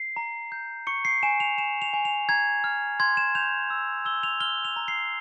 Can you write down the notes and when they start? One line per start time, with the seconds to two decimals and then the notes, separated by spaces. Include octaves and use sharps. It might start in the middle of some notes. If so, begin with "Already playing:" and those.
Already playing: C7
0.17 A#5
0.52 G6
0.87 C#6 C#7
1.05 C7
1.23 G#5 E7
1.40 F7
1.58 G#5 E7
1.82 F7
1.93 G#5
2.05 F7
2.29 A#5 G#6
2.64 F6
3.00 C6 G#6
3.17 E7
3.35 G6 F7
3.70 E6
4.05 E6 G7
4.23 F7
4.40 F6 G7
4.65 F7
4.76 A#5
4.88 C7